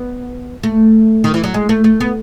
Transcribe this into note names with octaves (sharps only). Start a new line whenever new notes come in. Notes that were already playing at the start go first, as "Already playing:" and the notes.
Already playing: B3
A3
D#3
E3
F#3
G#3
A3
A3
B3